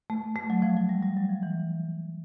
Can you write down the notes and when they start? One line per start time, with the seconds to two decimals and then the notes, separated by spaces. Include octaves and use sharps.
0.10 A3
0.36 A3
0.50 F#3
0.62 F3
0.77 F#3
0.89 G3
1.03 G3
1.16 F#3
1.29 F3
1.43 E3